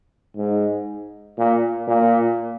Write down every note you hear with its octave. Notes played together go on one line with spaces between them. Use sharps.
G#2
A#2
A#2